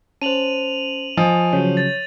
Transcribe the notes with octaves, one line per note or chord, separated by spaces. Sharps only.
C#4 C5 A5 D#7 F7 F#7
F3 D#5 G#5 D#6
C#3 F#3 C#5
A6